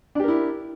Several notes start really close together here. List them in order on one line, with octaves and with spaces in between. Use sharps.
D4 G4 A#4 E4